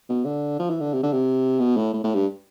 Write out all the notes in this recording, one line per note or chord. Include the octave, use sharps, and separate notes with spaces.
B2
D3
F3
E3
D3
C3
D3
C3
B2
A2
A2
A2
G2